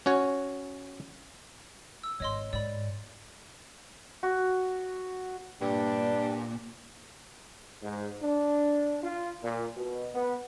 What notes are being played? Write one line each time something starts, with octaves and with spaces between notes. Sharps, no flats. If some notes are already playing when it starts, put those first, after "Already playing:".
C#4 F#4 C#5
E6
G#1 C#5 D#5 C6
G#2 D5 B5
F#4
G2 A#2 D4 G4
G#2
D4
F4
A#2
B2
B3